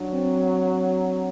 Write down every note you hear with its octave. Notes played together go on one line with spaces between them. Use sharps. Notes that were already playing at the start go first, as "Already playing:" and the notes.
Already playing: F#3 D4
C4